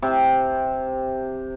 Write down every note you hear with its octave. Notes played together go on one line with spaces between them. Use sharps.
C3